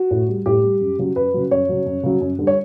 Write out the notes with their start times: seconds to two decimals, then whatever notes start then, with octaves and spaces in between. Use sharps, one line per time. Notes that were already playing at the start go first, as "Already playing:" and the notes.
Already playing: F#4
0.11 A2
0.29 G3
0.46 A2 G4
0.64 G3
0.81 F#2
0.98 C#3 F#3
1.16 F#2 B4
1.34 C#3 F#3
1.51 F#2 C#5
1.69 C#3 F#3
1.86 F#2
2.03 C#3 F#3
2.21 F#2
2.39 D3 G3
2.47 C#5